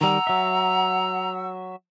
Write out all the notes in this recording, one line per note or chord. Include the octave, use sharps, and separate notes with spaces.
D#3 G3 F#5 A#5 E6
F#3 E5